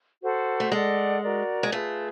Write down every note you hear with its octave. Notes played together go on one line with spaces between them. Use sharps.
F#4 A4 C5
A3
G#3 A4 D5 F#5
F#4 A#4 D5
G#3
A3 F4 G#4 B4